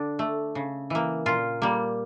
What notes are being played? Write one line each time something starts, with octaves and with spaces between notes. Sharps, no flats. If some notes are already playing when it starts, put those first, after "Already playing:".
Already playing: D3 D4
A3
C#3
E3 A#3
A#2 F4
G3 A#3